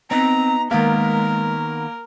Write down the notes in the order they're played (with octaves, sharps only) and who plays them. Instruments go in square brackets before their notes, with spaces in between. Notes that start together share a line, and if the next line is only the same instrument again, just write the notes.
[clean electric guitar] B3 D#4 [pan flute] C4 [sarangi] A#5
[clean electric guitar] D#3 B3 [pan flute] G#3 [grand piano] A#3 [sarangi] A#4